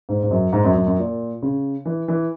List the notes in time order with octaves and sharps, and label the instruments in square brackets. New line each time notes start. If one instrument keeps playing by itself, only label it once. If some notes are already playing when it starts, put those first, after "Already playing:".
[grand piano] G#2
G#2
F#2
G#2
F#2
F#2
F#2
A#2
C#3
E3
E3